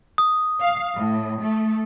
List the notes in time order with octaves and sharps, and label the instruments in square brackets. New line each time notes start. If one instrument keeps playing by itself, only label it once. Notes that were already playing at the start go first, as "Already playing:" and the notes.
[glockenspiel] D#6
[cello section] F5
A2
A3